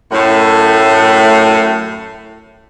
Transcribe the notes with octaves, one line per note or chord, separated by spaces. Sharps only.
F#2 A2